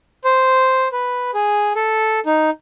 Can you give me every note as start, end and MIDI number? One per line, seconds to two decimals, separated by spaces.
0.24 0.88 72
0.92 1.31 71
1.34 1.73 68
1.75 2.20 69
2.26 2.50 63